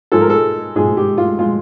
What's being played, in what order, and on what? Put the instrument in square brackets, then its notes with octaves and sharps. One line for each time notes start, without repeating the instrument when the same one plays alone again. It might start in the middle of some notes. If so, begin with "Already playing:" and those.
[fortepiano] G#2 F3 G#3 A4
A#4
A4
G#2 F3 G#3 G#4
G4
F4
F3 G#3 F4